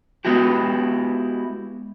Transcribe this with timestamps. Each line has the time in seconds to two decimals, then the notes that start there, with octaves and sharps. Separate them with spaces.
0.25 G#3 B3 E4 F#4 G4